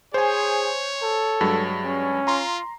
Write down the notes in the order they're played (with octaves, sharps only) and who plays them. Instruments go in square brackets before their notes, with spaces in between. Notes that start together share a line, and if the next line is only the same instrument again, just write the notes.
[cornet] G#4 [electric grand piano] C5 G#5 [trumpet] C#5
[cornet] A4
[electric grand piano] G2 F#3 G#3
[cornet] C#4
[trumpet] F4 [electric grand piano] A#5 C6